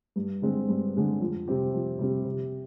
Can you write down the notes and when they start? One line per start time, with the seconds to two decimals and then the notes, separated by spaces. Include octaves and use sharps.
0.16 G2
0.42 D3 G#3 C4
0.69 G2
0.95 D3 G#3 C4
1.20 F2
1.48 C3 G3 C4 G4
1.74 F2
1.99 C3 G3 C4 G4
2.25 C3